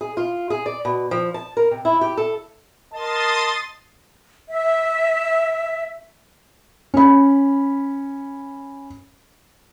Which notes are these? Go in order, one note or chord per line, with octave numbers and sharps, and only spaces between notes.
G#4
F4
G#4
D5
B2
F3
A5
A#4
C3
E4
G4
A4
A#4 D#5 A5 C6 D#6 A6
E5
C#4 B5